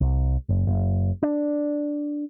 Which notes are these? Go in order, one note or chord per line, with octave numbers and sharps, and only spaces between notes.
C2
F#1
F#1
D4